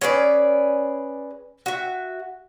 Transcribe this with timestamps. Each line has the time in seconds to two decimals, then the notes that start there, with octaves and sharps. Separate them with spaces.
0.01 C#4 G#4 B4 D5
1.66 F#4 E5